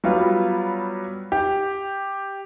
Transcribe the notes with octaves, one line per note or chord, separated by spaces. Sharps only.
F#3 G3 B3 F4
G4